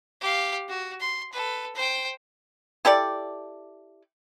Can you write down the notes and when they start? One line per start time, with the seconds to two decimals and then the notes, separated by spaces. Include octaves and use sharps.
0.21 G4 F5
0.68 F#4
1.00 C6
1.32 A4 B4
1.75 C5 G5
2.85 E4 G4 A4 D5